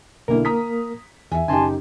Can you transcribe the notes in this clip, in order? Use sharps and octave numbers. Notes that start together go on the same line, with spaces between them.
B1 D3 A#3 E4 A#4
A#5 D#6 B6
E2 E5 G#5
F#1 D#4 G4 G#5 A5 C6